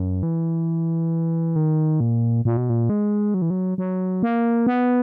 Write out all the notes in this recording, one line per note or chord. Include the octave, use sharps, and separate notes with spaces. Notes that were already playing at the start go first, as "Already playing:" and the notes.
Already playing: F#2
E3
D#3
A#2
A#2
B2
A#2
G#3
F#3
E3
F#3
F#3
A#3
B3